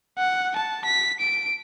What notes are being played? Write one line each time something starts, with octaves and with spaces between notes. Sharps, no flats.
F#5
A5
B6
D7